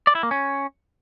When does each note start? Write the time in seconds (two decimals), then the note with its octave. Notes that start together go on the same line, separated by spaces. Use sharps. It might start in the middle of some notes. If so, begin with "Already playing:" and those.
0.07 D5
0.15 E4
0.23 A#3
0.31 C#4